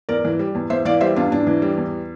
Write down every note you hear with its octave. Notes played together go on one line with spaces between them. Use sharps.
E2 A#4 D5
E3
G3
E2
E2 C5 E5
E3 D5 F5
G3 C5 E5
E2 D4 F4
E2 D4
E3
G3
E2